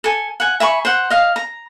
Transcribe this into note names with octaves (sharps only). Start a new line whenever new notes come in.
A4 G#5
F#5 G#5
E5 G#5 B5 C#6
C5 F#5
D#5 F5
A#5